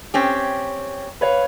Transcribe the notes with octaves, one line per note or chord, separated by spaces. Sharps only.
C4 C#4 G4
B4 C#5 F5